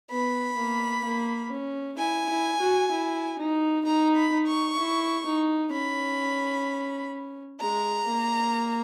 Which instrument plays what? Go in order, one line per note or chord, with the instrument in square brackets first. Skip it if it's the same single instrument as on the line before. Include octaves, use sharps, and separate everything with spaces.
[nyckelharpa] B3 [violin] B5
[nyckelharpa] A#3
A#3
C#4
[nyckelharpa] E4 [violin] G#5
[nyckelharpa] E4
F#4
E4
D#4
[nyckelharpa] D#4 [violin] A#5
[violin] B5
[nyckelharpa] D#4
[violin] C#6
[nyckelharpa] E4
D#4
[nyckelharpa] C#4 [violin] B5
[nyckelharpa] G#3 [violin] A#5
[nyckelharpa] A#3